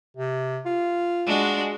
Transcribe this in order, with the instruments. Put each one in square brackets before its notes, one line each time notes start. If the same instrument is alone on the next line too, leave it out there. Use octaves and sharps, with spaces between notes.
[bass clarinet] C3
F4
[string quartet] G#3 D4 F#4